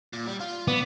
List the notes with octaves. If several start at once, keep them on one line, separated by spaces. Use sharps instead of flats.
A#2
G3
F4
B3 D5